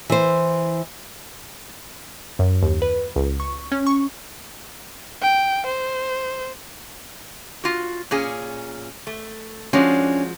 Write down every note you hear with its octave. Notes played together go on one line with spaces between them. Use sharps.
E3 C5
F#2
D#2
B4
C#2
C#6
C#4
C#6
G5
C5
F4 F#4
A#2 C#4 G#4
A3
F3 G#3 C#4 D4 F#4 D5